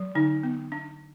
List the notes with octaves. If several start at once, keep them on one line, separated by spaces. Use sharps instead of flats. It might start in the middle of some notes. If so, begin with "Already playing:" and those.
Already playing: F#3
D3 D#4
B3
D4